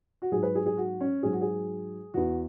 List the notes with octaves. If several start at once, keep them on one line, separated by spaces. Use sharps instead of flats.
F#4
G#2 F#3 G#4
B4
G#4
G#4
F#4
C#4
G#2 F#3 G#4
F#4
G#4
E2 E3 F#4